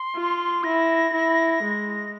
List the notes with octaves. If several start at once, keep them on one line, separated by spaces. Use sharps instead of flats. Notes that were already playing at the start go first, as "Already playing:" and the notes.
Already playing: C6
F4
E4 A#6
E4
G#3